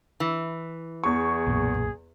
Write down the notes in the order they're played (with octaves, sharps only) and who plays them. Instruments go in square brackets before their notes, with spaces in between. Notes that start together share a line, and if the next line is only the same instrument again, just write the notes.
[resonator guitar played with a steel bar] E3
[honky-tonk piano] E2 C#6 [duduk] G#4
[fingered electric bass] B1 F#2 A#2